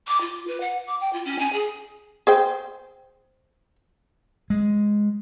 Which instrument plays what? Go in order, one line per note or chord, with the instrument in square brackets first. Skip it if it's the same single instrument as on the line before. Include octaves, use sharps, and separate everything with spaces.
[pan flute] D6
F4
B4
F#5
D6
G5
F4
C#4
G#5
G#4
[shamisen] G#4 C5 G5
[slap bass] G#3